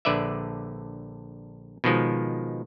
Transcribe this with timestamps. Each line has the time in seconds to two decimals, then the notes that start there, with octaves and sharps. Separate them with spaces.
0.05 A#1 D3 B4 D5 E5
1.84 B2 D#3 F3 G#3